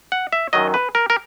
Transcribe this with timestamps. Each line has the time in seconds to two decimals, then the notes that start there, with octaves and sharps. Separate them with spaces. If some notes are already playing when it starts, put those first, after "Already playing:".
0.12 F#5
0.33 E5
0.53 F#2 D#3 F#3 D#5
0.74 B4
0.95 A#4
1.10 A#4